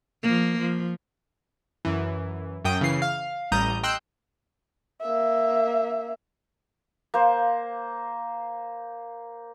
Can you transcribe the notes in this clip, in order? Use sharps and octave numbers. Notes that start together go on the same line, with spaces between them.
F3 A#3
F3
F#2 E3
F#2 G5 D#6
C#3 E3 C7
F5
A1 G3 A#5 D#6 G6
D#5 G5 C6 E6 F#6 G6
A#3 E5
A#3 C5